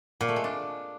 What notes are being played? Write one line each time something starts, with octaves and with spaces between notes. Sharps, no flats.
A#2
A3
G#3
D4